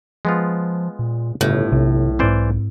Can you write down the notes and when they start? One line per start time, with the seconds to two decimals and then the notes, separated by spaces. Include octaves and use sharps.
0.25 F3 G#3 B3 F4
0.99 A#2
1.41 G1 A2 C#3
1.72 B1 C3
2.19 G#2 E3 C4 C5 D5